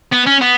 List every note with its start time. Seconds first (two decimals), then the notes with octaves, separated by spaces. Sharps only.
0.13 B3
0.27 C#4
0.42 B3